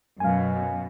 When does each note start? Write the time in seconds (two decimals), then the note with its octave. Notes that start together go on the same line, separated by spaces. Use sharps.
0.20 F#2 B2 F5 G#5